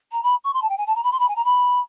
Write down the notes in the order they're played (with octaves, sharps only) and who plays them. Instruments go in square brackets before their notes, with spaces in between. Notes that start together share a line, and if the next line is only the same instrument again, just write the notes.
[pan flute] A#5
B5
C#6
C6
A5
G5
G#5
A5
A#5
B5
C6
B5
G#5
A#5
B5